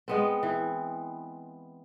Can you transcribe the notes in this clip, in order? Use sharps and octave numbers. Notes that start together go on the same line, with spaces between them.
G#3 B3 C4
E3